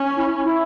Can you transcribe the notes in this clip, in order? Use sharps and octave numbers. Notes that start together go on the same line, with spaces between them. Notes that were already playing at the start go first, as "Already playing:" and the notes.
Already playing: C#4
E4
E4